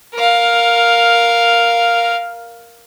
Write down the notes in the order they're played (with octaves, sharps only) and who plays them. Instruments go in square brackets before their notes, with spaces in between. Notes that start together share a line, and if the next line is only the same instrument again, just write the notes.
[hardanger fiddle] A#4 F5